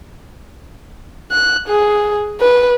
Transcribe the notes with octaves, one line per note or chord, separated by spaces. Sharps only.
F#6
G#4
B4